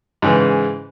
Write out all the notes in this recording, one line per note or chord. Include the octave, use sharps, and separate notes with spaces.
G#2 C#3 E3